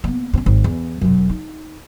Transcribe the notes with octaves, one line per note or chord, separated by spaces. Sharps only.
A#3 B3
G2 C#4
G#1
E2
E1 F#2
D#4